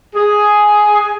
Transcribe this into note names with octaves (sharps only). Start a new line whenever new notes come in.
G#4